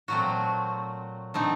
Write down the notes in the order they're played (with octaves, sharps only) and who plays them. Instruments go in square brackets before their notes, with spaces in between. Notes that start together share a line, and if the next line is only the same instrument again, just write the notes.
[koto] A#2 F#3 A3 C4 F#4
D3 A3 C4 D#4